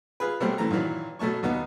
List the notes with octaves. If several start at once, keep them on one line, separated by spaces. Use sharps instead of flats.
F4 G#4 B4
B2 F#3 G3 A3 A#3 C4
F#2 E3 A3 A#5
A#2 D#3 E3 F#3
B2 F#3 A3 A5 C#6
D#2 B2 B3 D#4